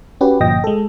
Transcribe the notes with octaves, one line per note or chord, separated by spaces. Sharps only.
C#4 F#4 G4 B4
G1 A#2 F3 D#5 G5 A#6
G#3 A4